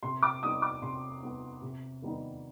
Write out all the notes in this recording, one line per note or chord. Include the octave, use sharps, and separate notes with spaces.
C3 C6
D6
G3 B3 D#4 D#6
D6
C3 C6
G3 B3 D#4
C3
D#3 G3 B3 D#4